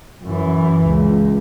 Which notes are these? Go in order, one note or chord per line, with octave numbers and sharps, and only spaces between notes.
F#2 E3
C#2